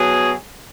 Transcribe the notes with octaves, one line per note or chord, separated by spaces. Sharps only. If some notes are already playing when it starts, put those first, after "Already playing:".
Already playing: B2 F#3 G#4